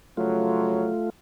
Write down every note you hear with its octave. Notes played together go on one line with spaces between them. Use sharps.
C#3 F3 F#3 A3 F4